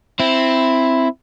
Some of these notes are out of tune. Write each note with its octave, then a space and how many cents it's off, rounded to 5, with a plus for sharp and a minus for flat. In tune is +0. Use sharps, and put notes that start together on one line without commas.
C4 +0 E4 +5